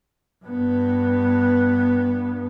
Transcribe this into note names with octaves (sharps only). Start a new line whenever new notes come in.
G2 B3